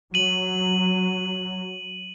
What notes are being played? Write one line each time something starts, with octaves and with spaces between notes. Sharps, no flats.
F#3 D#7 F#7